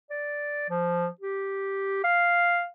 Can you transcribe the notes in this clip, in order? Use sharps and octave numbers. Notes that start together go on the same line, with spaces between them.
D5
F3
G4
F5